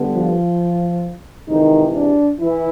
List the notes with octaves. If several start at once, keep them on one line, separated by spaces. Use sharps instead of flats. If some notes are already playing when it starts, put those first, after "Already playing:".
Already playing: D3 G3 B3
F3 F4
C3 D#3 E3 G#3 D#4
D4
E3 E4